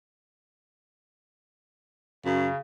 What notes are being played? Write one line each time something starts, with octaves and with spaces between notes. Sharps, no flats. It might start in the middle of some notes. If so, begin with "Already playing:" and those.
F#2 C#3